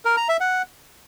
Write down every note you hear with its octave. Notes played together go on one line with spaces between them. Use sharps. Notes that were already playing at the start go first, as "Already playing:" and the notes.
A#4
A#5
E5
F#5